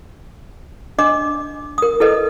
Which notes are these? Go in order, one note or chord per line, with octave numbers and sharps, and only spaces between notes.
D4 D#5 D6
A#4 D#6
E4 A4 B4 D#5